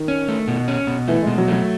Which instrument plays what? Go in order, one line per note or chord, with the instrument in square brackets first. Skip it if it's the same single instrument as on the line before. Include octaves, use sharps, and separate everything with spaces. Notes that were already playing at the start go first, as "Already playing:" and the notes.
Already playing: [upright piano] D#3
[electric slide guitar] C#4
A3
B2
C#4
B2
[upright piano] E3 [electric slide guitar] A3
[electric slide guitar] B2 [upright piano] G#3
[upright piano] F#3
[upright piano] F#3 [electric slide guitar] A3